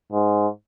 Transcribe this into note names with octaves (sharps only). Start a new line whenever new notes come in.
G#2